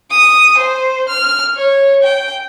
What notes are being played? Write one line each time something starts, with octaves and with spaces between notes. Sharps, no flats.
D#6
C5
F6
C#5
G5